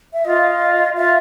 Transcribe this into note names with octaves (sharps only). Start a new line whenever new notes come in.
E5
F4 D#5
F4 E5